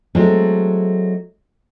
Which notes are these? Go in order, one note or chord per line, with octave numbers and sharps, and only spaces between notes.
F#3 G#3 A3 C4